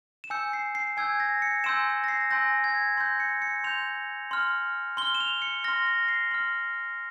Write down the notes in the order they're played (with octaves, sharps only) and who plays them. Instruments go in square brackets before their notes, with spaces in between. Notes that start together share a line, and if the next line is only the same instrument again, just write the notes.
[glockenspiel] E7
G#5 E6 G6 C#7
C7
C7
G#5 E6 G6 G#6
A#6
C#7
G#5 C6 E6 G6 E7
A#6
C7
G#5 C6 E6 G6 A#6
G#6
C6 A#6
G6
C#7
C#7
C6 G6 F7
C6 F6
C6 G7
F6
E7
F7
C#7
F6 A#6
C6
A#6
C7
C6 F6